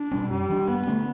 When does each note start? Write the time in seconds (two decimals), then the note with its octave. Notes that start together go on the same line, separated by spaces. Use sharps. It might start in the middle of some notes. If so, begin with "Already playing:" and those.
Already playing: D4
0.11 B2 G3 C#4
0.30 F#2 G3
0.49 E3 B3 D4
0.68 G2 B3
0.87 D3 A3 C#4